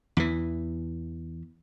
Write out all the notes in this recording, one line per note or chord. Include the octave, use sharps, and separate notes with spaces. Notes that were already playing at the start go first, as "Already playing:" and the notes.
E2 E3